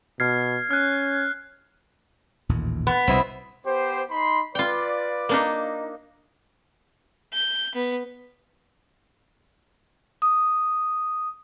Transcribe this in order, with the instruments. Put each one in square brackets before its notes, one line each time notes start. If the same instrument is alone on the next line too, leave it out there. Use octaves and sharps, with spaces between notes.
[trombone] B2 [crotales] F6 C7 [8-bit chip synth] G#6
[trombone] C#4 [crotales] F6 F#6
[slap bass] A1 D#2 A#2
[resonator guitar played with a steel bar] B3
[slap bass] C2 B2 G3 [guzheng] C4 E4 D#5
[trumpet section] B3 G4 C5
D#4 B5 C6
[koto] F4 G5 [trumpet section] B4 D5
[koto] A#3 D4 D#4
[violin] G6
B3
[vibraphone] D#6